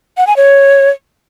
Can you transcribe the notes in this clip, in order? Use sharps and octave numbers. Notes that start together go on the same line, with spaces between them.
F#5
G#5
C#5